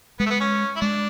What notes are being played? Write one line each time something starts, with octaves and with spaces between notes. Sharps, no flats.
G#3 B3
A3
B3
C#4
E4
G#3 D4